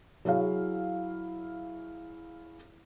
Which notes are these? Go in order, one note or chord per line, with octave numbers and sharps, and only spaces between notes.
F#3 E4 G#4 C#5 F5